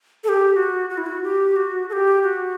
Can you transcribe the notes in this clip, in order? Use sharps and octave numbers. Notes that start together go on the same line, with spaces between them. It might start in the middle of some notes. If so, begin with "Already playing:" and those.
A4
G4
F#4
F#4
E4
F#4
G4
F#4
A4
G4
F#4